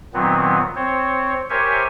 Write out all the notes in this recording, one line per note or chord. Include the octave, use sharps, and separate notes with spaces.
A#2 D#3 F#3 B3 C4
C4 C5 C#5
G4 A#4 C5 C#5 E5 G#5